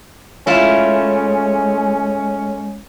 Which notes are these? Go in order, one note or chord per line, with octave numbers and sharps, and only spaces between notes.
G#3 A3 C#4 E4 F4